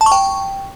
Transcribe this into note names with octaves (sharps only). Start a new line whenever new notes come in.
A5
C#6
G5